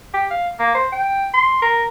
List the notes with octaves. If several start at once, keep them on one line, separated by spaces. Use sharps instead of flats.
G4
F5
A#3
C5
G5
C6
A#4